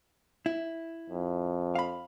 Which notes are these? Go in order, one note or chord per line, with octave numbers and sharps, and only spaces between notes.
E4
F2
F5 B5